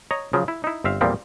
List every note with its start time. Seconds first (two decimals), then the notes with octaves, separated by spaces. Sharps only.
0.11 C#5 D#5 A#5
0.33 C#3 F3 F#3
0.48 E4
0.64 D#4 E4
0.84 G1 C4 E5 F5
1.01 E2 A#2 F3 G3 A#3 C4